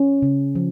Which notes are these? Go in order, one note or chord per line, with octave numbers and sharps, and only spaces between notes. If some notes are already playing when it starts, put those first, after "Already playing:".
Already playing: C#4
C#3
F3